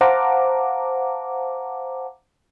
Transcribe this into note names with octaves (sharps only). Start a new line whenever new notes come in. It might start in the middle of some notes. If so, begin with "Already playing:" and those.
C5 F5 F#5 A5 A#5 D6